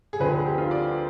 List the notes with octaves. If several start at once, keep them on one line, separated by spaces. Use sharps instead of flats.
G#4
D2 D3 F3 C4 B4
G#4
G4
F4
D5